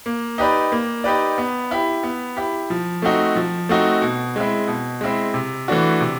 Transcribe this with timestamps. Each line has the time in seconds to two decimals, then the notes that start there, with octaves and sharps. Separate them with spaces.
0.06 A#3
0.38 D#4 G4 B4 D5
0.72 A#3
1.04 D#4 G4 B4 D5
1.38 B3
1.71 E4 G4
2.03 B3
2.36 E4 G4
2.70 F3
3.02 A3 C4 D#4 F#4
3.36 F3
3.69 A3 C4 D#4 F#4
4.02 B2
4.36 G#3 C4 E4
4.68 B2
5.01 G#3 C4 E4
5.34 C3
5.68 E3 A3 D4 F#4
6.01 C3